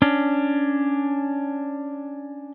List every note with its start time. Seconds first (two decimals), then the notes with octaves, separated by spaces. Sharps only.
0.02 C#4 D4